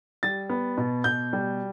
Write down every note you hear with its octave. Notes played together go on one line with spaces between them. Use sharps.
G3 A6
B3
B2
B2 G6
G3